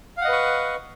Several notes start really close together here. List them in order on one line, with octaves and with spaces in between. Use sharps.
F5 F#5 D#5 B4 C#6